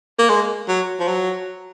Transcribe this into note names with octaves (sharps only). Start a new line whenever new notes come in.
A#3
G#3
F#3
F3
F#3